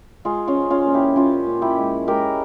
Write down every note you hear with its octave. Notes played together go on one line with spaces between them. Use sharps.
G#3 F4 G#4
C#4 F4
F3
C#4 F4
A#2
E4 G4
A#2 C#4 F4
A#2
E4 G4
G#3
G#3 G4 A#4